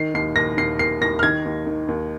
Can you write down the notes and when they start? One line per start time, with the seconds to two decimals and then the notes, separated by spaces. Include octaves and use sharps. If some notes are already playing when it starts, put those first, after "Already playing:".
Already playing: D#3 C7
0.14 D#2 C7
0.36 D#2 A#6
0.57 D#2 C7
0.79 D#2 C7
1.01 D#2 A#6
1.19 F6
1.23 D#3 G#6
1.45 D#2
1.66 D#3
1.88 D#2